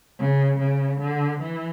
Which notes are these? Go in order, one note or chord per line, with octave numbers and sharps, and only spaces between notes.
C#3
C#3
D3
E3